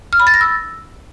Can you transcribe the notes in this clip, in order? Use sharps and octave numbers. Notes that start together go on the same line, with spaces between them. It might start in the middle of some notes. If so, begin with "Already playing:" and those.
F6
B5
A6
A#6
E6